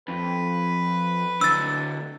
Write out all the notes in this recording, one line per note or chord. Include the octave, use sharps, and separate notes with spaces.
F2 B4
D3 F#3 E6 A6